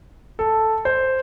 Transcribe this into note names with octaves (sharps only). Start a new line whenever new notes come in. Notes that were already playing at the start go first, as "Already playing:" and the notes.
A4
C5